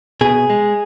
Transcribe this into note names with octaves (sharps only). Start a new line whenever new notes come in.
B2 G#4
G#3